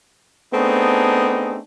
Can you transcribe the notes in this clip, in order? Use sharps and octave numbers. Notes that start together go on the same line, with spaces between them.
A3 B3 C4 D4 D#4 G#4